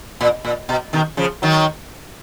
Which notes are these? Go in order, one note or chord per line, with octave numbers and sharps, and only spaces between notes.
A#2
A#2
B2
B2 D#3
C#3 F3
D#3 F#3